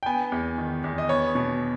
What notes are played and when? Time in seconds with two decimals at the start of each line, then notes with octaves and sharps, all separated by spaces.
0.03 G5
0.06 B3 G#5
0.32 E2
0.58 D#3
0.84 E2
0.98 D#5
1.09 B3 C#5
1.35 B2